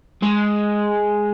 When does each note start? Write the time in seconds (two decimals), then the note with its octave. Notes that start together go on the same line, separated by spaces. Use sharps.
0.23 G#3